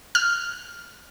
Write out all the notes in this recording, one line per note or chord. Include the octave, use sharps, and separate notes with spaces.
F6